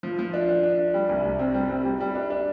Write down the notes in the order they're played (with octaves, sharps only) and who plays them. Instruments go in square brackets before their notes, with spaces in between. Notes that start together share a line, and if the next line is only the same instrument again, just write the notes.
[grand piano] F3
F3
D4
D4
D4
D4
G3
C2
C2
C4
G3
C4
G3
G3
D4
D4